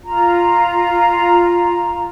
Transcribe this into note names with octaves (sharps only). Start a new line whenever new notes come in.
F4 A#5